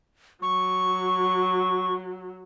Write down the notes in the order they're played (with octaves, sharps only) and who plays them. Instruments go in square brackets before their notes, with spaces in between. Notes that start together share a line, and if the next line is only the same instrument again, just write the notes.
[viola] F#3 [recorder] C#6